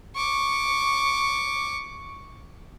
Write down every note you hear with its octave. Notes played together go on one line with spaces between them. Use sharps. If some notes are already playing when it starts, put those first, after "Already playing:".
C#6 D6